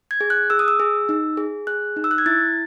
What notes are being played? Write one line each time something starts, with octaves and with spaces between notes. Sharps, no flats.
G#6
G#4
F#6
G#4 E6
D#6
E6
G#4
D#4
G#4
G#4 F#6
D#4
E6
F#6
G#6
E4 A6